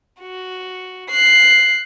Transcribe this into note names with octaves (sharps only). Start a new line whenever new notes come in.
F#4
F#6 C7